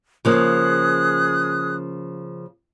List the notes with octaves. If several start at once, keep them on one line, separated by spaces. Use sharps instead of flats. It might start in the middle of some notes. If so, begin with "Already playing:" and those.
C#3 F3 A#3 G#4 D#6 F#6